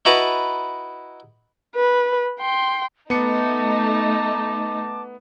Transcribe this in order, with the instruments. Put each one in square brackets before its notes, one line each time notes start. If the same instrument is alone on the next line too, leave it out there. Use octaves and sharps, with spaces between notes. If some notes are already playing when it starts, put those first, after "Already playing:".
[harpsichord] D#4 E4 F#4 B4 A5 A#5
[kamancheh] B4
G5 C6
[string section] A3 D#4 [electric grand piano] B3 C#7 [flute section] A5 D6